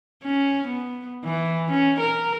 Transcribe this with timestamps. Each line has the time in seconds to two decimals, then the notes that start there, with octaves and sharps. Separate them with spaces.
0.23 C#4
0.67 B3
1.25 E3
1.71 C#4
2.00 A#4